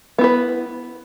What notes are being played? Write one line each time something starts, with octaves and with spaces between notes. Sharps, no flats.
B3 E4 B4